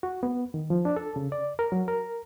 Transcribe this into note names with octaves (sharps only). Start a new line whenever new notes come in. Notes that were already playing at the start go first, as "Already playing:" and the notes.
F#4
B3
D#3
F3
D4
A4
C#3
D5
A#4
F#3
A#4